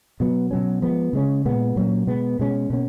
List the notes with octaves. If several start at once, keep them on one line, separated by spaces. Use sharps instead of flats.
B2 F#3 B3
B2 F#3 C#4
F3 G#3 B3
C#3 G#3 C#4
A#2 G#3 B3
A#2 F#3 A#3 C#4
B2 G#3 B3
B2 G#3 C#4
B2 A#3 C#4